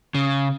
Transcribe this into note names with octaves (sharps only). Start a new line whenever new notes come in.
C#3